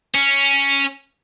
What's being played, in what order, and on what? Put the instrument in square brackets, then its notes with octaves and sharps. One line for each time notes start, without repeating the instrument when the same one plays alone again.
[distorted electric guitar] C#4